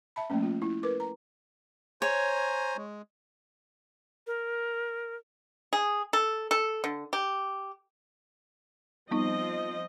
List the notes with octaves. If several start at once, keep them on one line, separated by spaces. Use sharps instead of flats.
E5 A5 B5
F3 A3 A#3 C#4
F4
E4
A#4 B4 D6
A#5
C5 C#5 G#5 A#5
G#3
A#4
G#4
A4
A4
D3
G4
F3 G3 B3 C4 D#4 D#5